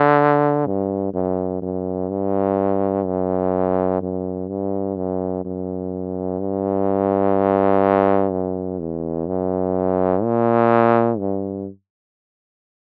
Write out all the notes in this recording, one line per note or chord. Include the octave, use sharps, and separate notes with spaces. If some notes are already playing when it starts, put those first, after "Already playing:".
Already playing: D3
G2
F#2
F#2
G2
F#2
F#2
G2
F#2
F#2
G2
F#2
E2
F#2
A#2
G2